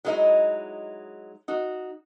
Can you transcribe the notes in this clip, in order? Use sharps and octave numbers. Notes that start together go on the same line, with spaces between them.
F#3 G#3 D#4 E4 D#5
D#4 F#4